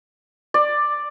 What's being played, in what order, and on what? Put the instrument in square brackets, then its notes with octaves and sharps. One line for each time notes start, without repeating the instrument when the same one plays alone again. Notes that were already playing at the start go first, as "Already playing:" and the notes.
[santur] D5